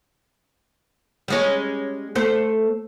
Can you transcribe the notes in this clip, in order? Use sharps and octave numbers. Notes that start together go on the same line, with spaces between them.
G3 G#3 C#4
A3 C5